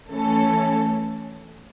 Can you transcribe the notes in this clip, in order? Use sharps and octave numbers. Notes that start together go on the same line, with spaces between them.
E3 A3 C#4 A4